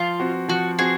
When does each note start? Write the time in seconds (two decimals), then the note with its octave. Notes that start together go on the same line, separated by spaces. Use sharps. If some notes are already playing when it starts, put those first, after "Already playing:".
Already playing: F3 F4
0.20 C4 F#4
0.49 F3 F#4
0.79 C4 F#4 G#4